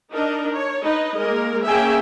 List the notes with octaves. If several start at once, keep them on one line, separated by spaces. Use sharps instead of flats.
D4 D#4 A#4 D#5
C#5
D#4 B4 D#5
G#3 A#3 A#4
A#3 C#4 G#4 E5 G5 G#5